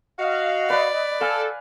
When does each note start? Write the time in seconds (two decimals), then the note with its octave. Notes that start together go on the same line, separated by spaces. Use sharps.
0.19 F#4 D#5 F5
0.70 B4 D5 B5
1.21 A4 F5 G#5